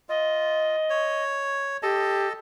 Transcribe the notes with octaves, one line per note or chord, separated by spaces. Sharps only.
F4 D#5
C#5
G4 A4 D#5 A5